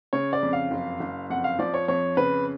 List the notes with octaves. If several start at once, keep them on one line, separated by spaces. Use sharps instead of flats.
C#3 C#5
D5
F2
F5
F#1
F#1
F2 F#5
F5
F3 D5
C#5
F2 C#5
C#3 B4